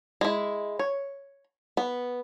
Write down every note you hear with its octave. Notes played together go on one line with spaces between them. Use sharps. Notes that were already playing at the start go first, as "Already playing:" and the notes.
G#3 E4
C#5
B3